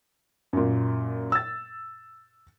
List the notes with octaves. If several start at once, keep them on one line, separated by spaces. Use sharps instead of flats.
F#2 A#2
E6 A6